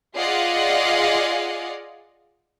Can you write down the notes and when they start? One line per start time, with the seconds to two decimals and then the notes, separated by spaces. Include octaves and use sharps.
0.16 F4 G#4 D5 D#5 F5 F#5